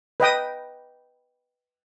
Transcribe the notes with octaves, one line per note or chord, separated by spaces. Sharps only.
B4 D#5 G5 D#6